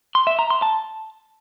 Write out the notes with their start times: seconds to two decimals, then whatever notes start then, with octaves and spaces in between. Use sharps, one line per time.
0.15 C6
0.27 E5
0.39 A#5
0.50 C6
0.62 A5